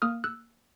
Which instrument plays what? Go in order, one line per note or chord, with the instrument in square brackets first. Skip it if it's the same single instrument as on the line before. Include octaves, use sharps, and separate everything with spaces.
[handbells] A#3 D#6 F6
E6 F#6